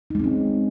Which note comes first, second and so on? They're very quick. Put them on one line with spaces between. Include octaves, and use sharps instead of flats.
D#4 G#3 C4 C#4